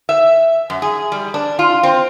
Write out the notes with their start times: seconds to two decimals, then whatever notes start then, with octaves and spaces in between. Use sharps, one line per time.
0.09 E5
0.70 F#2
0.82 G#4
1.12 G3
1.34 D4
1.59 F4
1.83 C4